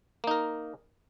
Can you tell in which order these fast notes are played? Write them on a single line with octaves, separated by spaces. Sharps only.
A#3 D#4 A#4